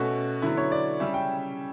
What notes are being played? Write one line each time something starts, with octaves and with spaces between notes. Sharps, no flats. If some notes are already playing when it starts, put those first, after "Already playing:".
Already playing: B2 A3 C#4 F#4
D3 F#3 B3 E4
C#5
D5
C#3 G3 C#4 E5
G5